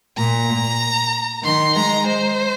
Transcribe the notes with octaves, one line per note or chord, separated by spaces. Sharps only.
A#2 A#5
D#3 C6
G#3 A#5
C5